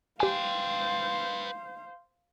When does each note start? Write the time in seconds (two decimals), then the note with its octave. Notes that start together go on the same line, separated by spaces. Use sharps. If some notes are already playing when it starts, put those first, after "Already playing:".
0.20 G4 B4 C5 F5 G5 G#5